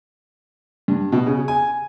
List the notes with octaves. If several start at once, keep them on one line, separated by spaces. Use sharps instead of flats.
G2
B2
C#3
G#5